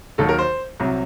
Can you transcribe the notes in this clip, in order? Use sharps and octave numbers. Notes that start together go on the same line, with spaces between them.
D#2 D#3 F#3 A4
A#4
C5
C2 C3 F#3